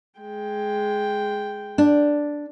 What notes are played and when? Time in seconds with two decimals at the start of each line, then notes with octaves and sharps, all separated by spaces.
0.20 G#3 G5
1.78 D4